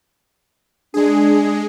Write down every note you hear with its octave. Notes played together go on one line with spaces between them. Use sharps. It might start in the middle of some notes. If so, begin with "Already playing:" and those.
G#3 D4 G#4